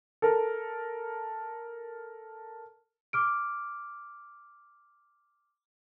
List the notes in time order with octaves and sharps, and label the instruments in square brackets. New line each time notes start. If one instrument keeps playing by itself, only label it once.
[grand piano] A4 A#4
[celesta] D6 F6 D7